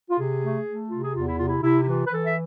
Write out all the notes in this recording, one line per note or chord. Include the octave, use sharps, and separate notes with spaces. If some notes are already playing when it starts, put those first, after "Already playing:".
F4
C3 G#4
A3
A3
C3 F4
G#4
E2 F4
E4
C3 F4
E4
C3 E4
E4
E3 F4
B4
E3 A4
E5